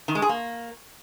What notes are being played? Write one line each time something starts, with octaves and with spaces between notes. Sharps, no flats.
D#3
G#3
G#4
A#3